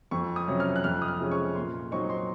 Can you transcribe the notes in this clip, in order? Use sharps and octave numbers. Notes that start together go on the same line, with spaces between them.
F2 C#6
D#6
C3 F#3 C#4
F6
F#6
F2 F6
D#6
F6
C3 F3 G#3 C#4
C#6
A#2 C6
F#3 C4 D#4 C#6
C6